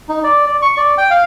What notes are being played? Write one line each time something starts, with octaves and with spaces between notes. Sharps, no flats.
D#4
D5
D5
C#6
D5
G5
F5